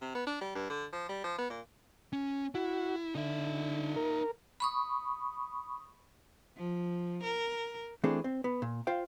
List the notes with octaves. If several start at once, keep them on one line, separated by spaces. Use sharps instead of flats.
C3
B3
D4
G3
G2
D3
F3
G3
F3
B3
A#2
C#4
E4 F#4
D3 D#4 E5
A#4
B5 C#6 D#6
F3
A#4
E3 A3 C4 D4 G#4
C4
B3
A#2
F4 C5 F5 G5